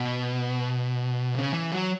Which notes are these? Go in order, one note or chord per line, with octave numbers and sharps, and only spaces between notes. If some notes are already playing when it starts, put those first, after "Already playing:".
Already playing: B2
C#3
E3
F#3